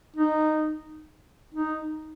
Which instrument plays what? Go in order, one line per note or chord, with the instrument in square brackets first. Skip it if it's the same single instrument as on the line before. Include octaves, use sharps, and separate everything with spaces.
[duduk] D#4
D#4